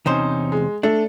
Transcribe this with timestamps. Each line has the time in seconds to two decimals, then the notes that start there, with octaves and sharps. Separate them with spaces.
0.06 E2 C3 C#4 D#4 C5
0.52 G#3
0.83 A3 D4 A4